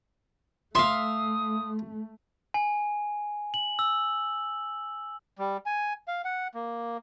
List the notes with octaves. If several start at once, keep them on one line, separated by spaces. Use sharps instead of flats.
A3 E5 F5 C6 D#6
G#5
F#7
E6
G3
G#5
F5
F#5
A#3